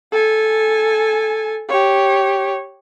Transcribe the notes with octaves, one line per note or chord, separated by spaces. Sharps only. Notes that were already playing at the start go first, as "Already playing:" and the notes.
A4 G#5
G4 C#5